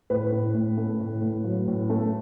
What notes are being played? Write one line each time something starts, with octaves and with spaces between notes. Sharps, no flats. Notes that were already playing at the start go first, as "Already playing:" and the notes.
A2 B4
A2
A2
A3
A2
A2
F#3
A2
A3